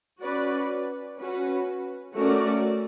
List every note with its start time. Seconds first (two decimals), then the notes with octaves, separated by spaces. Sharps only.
0.22 C#4 F#4 B4 D5
1.19 C#4 F#4 B4
2.15 A3 C#4 F#4 A#4 D5